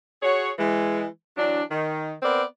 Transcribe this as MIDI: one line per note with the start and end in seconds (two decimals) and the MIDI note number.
0.23 0.51 66
0.23 0.51 68
0.23 0.51 73
0.59 1.06 52
0.59 1.06 56
1.37 1.62 52
1.37 1.62 54
1.37 1.62 62
1.71 2.13 51
2.23 2.42 59
2.23 2.42 60
2.23 2.42 70
2.23 2.42 74